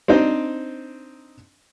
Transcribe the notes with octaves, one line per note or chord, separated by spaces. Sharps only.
C4 D4 D#4 C5